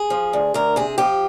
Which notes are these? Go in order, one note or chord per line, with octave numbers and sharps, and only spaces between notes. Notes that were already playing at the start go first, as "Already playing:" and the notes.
Already playing: G#4
F3
D2
D2 A#4
C3 G#4
F3 G4